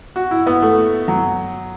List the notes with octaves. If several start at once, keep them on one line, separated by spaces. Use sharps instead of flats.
F#4
E4
B3
A3
F#3